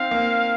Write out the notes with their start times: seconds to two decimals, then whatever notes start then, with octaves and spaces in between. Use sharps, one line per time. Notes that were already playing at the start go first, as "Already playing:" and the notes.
Already playing: C4 D#4 F5
0.11 A#3